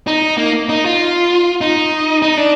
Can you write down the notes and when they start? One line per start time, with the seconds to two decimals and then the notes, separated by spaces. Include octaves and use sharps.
0.07 D#4
0.37 A#3
0.69 D#4
0.84 F4
1.61 D#4
2.22 D#4
2.37 D4